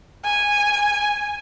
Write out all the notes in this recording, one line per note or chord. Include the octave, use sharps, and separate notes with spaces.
G#5